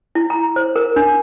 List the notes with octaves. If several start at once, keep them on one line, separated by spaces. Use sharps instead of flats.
E4
A#5
C5
A#4
D4